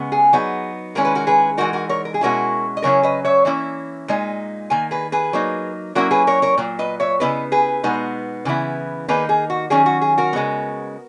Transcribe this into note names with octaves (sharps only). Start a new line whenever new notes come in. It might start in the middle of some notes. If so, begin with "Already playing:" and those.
Already playing: C#3 G#3 B3
G#4
F#3 B3 D#4
D#3 G#3 C#4 E4 A#4
B4
F#4 A#4
G#4 B4
E3 G#3 D#4 F#4 A#4
F#4 A#4
A#4 C#5
A#4
G#4
B2 G#3 C#4 E4 F#4 A#4
D#5
C#3 F#3 C#4 E4 A#4 C#5
B4 D#5
C#5 E5
E3 A#3 C#4 E4
A#2 G#3 D#4
D#3 A#3 G#5
G#4 B4
G#4 B4
F#3 A#3 D#4
F#3 A#3 C#4 E4 F#4 A#4
G#4 B4
A#4 C#5
A#4 C#5
A#2 F#3
B4 D#5
C#5 E5
C#3 G#3 B3 E4 B4 D#5
G#4 B4
B2 G#3 B3 D#4
C#3 E3 B3 E4
D#3 A#3 D#4 G#4 B4
G#4
F#4
D#3 F#3 C#4 G#4
F#4
G#4
F#4 A#4
C#3 G#3 B3